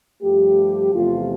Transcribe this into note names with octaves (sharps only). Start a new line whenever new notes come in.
G2 F3 A3 G4
E2 C3 F3 A3 F4